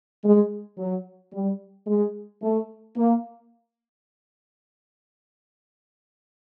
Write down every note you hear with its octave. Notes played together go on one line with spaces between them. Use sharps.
G#3
F#3
G3
G#3
A3
A#3